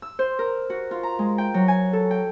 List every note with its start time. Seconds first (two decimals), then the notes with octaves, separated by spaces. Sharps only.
0.02 E6
0.19 C5
0.39 A#4
0.70 F#4
0.91 F4
1.03 A#5
1.19 G#3
1.38 G5
1.54 F#3
1.68 G#5
1.93 A4
2.11 G5